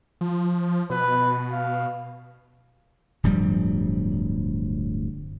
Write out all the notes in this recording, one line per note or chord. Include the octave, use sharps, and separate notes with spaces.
F3
B2 B4
F5
D1 G2 F3 G3